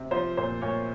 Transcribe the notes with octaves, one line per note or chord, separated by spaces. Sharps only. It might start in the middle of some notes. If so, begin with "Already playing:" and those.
Already playing: C3
F3 C5
A#2 C5
A#2 C#5